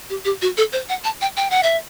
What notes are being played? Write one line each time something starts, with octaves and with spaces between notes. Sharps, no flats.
G4
G4
F#4
A4
C5
F#5
A5
G5
G5
F#5
E5